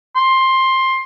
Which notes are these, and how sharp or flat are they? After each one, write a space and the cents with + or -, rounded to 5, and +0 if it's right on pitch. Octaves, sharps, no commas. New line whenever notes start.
C6 +15